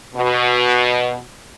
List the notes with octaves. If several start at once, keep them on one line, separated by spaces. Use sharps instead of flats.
B2